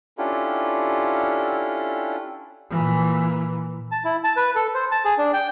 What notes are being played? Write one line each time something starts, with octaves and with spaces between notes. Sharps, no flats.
C#4 D4 E4 F4 G4 A4
A#2 E3
A5
E4
A5
B4
A4
C5
A5
G#4
D4
G5